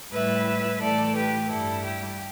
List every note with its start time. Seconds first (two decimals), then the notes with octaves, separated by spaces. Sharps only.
0.12 A2 G3 E4 B4 E5
0.82 A2 E3 A3 A4 D5
1.15 G4 B4
1.50 G2 G3 E4 A4
1.83 G4